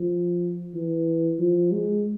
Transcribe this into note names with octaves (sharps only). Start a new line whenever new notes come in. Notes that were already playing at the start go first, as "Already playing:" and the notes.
Already playing: F3
E3
F3
G#3